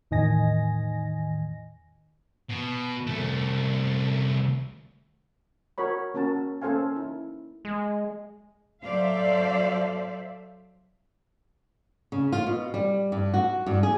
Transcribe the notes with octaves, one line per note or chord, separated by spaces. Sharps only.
E2 A2 D#3 D#5 G#5 A#6
B2
C2 A3
F#4 A#4 C#5 B5
A#3 C#4 F#4 A#4 A5
A#3 C#4 A4 C5 F5 G#5
D#4 E4
G#3
F#3 A4 C5 D5 E5 F5
C#3
F4
B2
G3
G2
F#4
G2
G#4